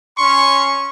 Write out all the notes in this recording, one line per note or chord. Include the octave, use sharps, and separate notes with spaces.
C#4 C6 C#6